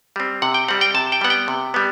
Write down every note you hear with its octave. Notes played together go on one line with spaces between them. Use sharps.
G3 C4
C3 F#5
G5
G3 C4 F#5
G5
C3 A5
G5
G3 B3 F#5
G5
C3
G3 B3